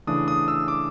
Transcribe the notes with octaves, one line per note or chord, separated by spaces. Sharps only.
C#3 E3 A3 D4 D#6
D#6
E6
D6